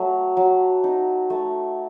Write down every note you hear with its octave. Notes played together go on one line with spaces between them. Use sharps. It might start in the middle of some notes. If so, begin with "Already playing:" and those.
Already playing: F#3 A3
F#3
D#4
A3